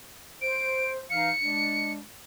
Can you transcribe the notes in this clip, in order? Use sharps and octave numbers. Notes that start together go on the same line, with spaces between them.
C5 D7
E3 D#4 F5 C#7
G#3 D4